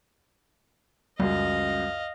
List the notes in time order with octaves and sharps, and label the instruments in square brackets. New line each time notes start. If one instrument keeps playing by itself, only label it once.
[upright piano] C#2 F#2 [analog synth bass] G3 [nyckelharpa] D#5 F5